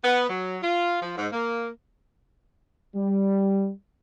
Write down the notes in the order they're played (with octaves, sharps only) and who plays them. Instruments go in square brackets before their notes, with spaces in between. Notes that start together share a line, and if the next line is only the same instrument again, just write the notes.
[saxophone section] B3
F#3
F4
F3
G#2
A#3
[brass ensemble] G3